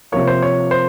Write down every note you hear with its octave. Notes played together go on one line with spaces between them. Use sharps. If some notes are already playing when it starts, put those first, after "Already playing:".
C3 F3 A#3 C#5
C5
C#5
C5